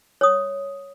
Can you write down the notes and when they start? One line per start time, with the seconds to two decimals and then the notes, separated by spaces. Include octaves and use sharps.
0.21 C#5 D#6